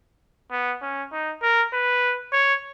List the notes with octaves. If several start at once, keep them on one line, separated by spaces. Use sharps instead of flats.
B3
C#4
D#4
A#4
B4
C#5